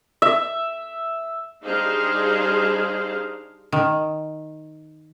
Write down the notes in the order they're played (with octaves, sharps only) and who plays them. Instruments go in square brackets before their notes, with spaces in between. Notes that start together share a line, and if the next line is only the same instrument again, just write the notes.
[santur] E5
[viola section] G3 D4 D#4 G#4 C5 F5
[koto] D#3